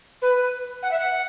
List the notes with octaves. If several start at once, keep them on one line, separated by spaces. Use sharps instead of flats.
B4
F#5
E5
F#5